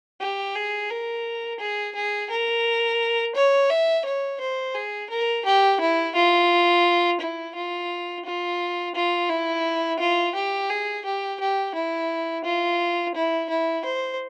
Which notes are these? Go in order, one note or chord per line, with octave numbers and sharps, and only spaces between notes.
G4
G#4
A#4
G#4
G#4
A#4
C#5
E5
C#5
C5
G#4
A#4
G4
E4
F4
E4
F4
F4
F4
E4
F4
G4
G#4
G4
G4
E4
F4
E4
E4
C5